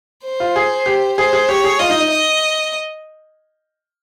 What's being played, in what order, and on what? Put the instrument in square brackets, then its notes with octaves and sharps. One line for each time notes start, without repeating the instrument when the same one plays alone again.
[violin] C5
[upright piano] F4
G#4
G4
[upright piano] G#4 [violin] C5
[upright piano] G#4
[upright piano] G4 [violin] C#5
[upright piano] G#4
[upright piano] F4 [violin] D#5
[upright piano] D#4
D#4
[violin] D#5